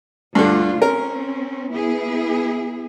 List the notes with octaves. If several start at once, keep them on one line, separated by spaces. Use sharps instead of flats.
D2 G2 D3 F4
C4 C#4 A#4
B3 E4 G#4